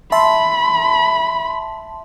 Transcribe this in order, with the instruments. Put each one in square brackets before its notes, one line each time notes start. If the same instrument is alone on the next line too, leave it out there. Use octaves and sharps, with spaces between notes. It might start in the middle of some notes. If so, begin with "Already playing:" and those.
[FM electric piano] E5 A5 C6 [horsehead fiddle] B5